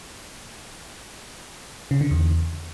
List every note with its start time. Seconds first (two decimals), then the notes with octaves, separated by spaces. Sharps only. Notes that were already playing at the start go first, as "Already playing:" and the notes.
1.91 C#3
2.01 D3
2.11 E2